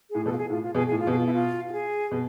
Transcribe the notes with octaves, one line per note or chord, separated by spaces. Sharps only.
A2 G#4
B2 A4
F4
G#4
A2 F4
F4
B2 G#4
G#4
A2
F4
B2 G#4
F4
E4
F4
F4
G#4
B2